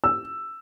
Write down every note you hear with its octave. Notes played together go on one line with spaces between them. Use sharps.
E6